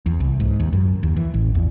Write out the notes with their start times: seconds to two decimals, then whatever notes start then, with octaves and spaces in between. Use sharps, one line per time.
0.06 E2
0.20 C2
0.40 G#2
0.60 D#2
0.73 F#2
1.03 D#2
1.16 E3
1.34 A1
1.55 E2